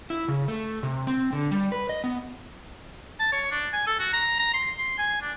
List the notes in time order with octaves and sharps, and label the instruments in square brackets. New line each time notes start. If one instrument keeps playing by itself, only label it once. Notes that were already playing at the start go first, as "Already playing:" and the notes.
[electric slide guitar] E4
C#3
A3
C3
C4
D3
G3
B4
D#5
B3
[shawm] A5
C#5
D4
G#5
A4
F#4
A#5
A#5
C6
C6
G#5
D4